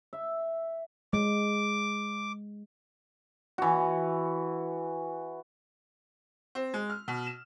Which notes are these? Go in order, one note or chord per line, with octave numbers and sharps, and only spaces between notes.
E5
G#3 D6
E3 F#4
C4
G#3
F6
B2
E7